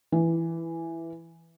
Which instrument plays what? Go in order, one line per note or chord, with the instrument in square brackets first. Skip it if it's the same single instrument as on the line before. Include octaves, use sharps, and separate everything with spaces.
[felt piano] E3